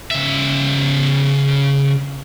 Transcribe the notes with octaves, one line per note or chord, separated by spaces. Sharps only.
C#3 E5